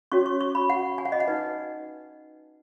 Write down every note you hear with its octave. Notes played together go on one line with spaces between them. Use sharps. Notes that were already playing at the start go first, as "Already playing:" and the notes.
C#4 F#4 C#5 C#6
C#6
C#6
B5
F#5
G#5
F#5
D#5
F#5
D#4 B4